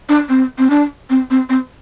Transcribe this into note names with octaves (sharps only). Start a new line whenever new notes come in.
D4
C4
C4
D4
C4
C4
C4